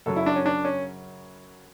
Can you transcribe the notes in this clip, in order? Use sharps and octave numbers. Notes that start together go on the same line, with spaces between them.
F#2 C#3 F#3 A4
E4
D4
C#4
D4
C#4